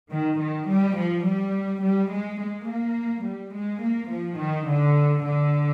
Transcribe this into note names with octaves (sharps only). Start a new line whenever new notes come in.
D#3
D#3
G3
F3
G3
G3
G#3
G#3
A#3
G3
G#3
A#3
F3
D#3
D3
D3